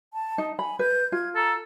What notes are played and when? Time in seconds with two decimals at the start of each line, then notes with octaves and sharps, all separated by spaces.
0.13 A5
0.38 D#4
0.59 G#5 B5
0.79 B4 G6
1.12 F4 G#6
1.36 A4 A#5